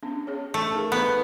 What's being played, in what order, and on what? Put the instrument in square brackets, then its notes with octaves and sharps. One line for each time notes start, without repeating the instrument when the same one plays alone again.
[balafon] B3 C#4 D4
C#4 G#4 C#5
[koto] A3
[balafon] D#4 G#4 A#4
[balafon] A3 D#4 A4 [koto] B3